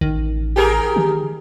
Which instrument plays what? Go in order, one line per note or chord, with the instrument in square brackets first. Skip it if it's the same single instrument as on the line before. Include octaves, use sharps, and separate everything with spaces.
[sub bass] A1 [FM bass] D#3
[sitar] G4 G#4 A#4
[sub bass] D#3